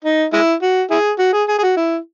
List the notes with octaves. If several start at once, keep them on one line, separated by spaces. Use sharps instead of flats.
D#4
G#3 E4
F#4
E4 G#4
F#4
G#4
G#4
G#4
F#4
E4